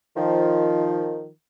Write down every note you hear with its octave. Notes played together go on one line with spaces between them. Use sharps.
D#3 F3